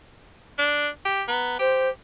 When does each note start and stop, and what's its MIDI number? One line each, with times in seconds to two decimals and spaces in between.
0.59 0.88 62
1.05 1.23 67
1.28 1.56 59
1.28 1.58 82
1.59 1.90 67
1.59 1.89 72